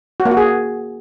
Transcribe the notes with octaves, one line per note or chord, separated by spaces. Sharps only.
F#4
A#3
F#4
G#4